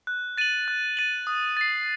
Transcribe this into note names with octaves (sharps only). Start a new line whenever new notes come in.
F#6
A6 D#7 F#7
F#6
A6 D#7 F#7
D#6
A6 C7